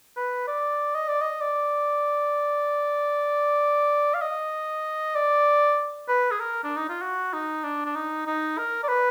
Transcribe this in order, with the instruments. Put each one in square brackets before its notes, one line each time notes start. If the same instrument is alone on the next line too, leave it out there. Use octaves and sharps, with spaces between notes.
[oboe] B4
D5
D#5
D5
D#5
D5
F5
D#5
D5
B4
G#4
A#4
D4
D#4
F4
F#4
D#4
D4
D4
D#4
D#4
A#4
D5
B4